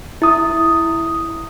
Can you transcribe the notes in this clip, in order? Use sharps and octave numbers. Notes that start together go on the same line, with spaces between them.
E4 D#6